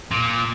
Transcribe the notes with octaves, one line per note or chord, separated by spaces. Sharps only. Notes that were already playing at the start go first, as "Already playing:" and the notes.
A#2